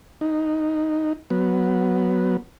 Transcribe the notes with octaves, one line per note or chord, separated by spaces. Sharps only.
D#4
F#3 B3